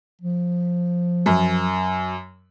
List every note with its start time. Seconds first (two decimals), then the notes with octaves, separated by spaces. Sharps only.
0.21 F3
1.26 F#2